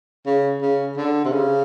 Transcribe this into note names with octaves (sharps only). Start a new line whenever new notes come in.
C#3
C#3
D3
C3
C#3